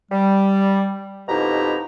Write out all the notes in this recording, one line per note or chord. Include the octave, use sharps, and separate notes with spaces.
G3
F2 B2 D#4 E4 G4 A#5